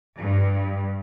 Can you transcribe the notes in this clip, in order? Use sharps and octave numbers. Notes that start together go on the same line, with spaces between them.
G2